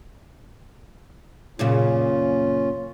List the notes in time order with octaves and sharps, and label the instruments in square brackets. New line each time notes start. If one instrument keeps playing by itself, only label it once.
[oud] F#2 A#2 C#3 [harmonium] C#4 F4